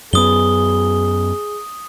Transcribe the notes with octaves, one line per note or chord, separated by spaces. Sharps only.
F#2 B3 G#4 D#6 G7